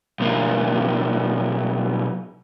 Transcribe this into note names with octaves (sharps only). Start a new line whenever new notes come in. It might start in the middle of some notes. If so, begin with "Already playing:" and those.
B1 A#3